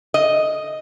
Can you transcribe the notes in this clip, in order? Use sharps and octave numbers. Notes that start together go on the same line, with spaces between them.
D#5